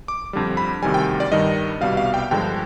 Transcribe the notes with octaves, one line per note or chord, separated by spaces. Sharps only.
D6
F2 D3 G3
B5
D2 C3 D#3 G3 G#5
G5
D5
G2 D#3 G3 D#5
C2 B2 G3 F5
F5
G5
G2 D3 F3 G#3 G5